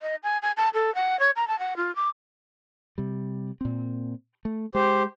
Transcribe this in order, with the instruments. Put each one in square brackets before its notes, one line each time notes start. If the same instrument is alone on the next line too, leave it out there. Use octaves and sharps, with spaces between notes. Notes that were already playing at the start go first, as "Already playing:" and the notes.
[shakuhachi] D#5
G#5
G#5
A5
A4
F#5
C#5
A#5
A5
F#5
F4
D6
[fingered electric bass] C3 G3
A#2 C4
A3
[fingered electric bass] G#3 [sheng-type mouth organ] G4 C5